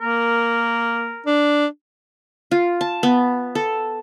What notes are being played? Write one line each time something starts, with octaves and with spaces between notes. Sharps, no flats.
A#3 A#4
D4
F4
A5
B3
A4